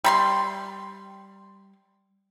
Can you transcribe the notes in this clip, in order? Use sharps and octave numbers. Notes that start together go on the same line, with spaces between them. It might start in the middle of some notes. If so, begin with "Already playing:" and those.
G3 B5 C6